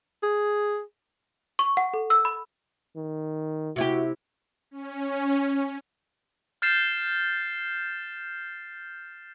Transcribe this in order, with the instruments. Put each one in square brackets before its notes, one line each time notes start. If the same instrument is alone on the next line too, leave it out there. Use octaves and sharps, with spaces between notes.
[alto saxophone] G#4
[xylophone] C#6
F#5
A4
E6
B5
[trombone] D#3
[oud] C3 E4 G4 [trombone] F#4
[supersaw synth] C#4
[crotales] F6 G6 A6 C7 E7